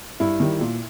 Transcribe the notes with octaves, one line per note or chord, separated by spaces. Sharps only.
G2 E4
D#3 G3
A#2